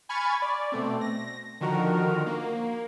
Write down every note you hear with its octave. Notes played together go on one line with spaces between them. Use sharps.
G#5 B5 C#6 F6 G#6 A6
D5
B2 A3 C4
A#6
D3 D#3 F3 F#4 A#4
A#3